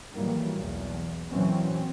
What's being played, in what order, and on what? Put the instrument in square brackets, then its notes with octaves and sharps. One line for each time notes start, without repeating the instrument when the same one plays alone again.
[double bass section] A2 D#3 E3 F#3 G3 A#3
B1 E2
A#2 E3 F#3 C4 C#4